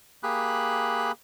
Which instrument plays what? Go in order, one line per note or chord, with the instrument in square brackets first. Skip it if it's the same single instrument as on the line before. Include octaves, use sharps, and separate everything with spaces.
[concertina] A#3 G4 G#4 B5 F#6